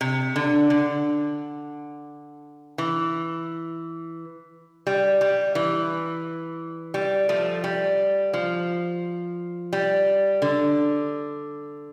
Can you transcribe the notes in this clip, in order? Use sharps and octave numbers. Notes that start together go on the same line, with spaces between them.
C3
D3
D3
E3
G3
G3
E3
G3
F3 A3
G3
F3
G3
D3